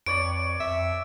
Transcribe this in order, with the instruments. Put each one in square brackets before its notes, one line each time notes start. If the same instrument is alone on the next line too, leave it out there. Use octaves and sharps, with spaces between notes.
[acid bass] F2 [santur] B4 C#5 D5 [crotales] D7
[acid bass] F2 [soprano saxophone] E5